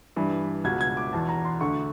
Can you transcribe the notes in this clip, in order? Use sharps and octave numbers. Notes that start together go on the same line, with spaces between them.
G2 E3
C#2 B2 G#6
G#6
D6
E2 B2 A5
A#5
C6
D2 D3 C#6